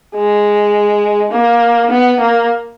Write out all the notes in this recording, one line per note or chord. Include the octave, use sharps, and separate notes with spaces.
G#3
A#3
B3
A#3